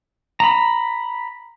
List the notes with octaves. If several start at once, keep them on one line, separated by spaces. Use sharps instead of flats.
A#5 B5